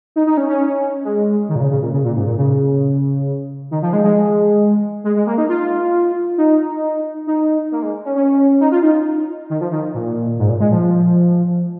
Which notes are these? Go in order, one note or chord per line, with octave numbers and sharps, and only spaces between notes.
D#4
D#4
C#4
C#4
G#3
D#3
A#2
C#3
C#3
A#2
C#3
A#2
G#2
A#2
C#3
D#3
F3
G#3
G#3
G#3
G#3
A#3
D#4
F4
D#4
D#4
A#3
G#3
C#4
C#4
D#4
F4
D#4
D#3
F3
D#3
A#2
G#2
A#2
G#3
F3